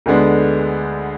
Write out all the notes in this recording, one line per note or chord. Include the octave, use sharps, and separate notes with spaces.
D2 D3 G#3 B3 D4